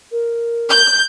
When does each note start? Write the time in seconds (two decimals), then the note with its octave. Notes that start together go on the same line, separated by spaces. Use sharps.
0.11 A#4
0.70 G6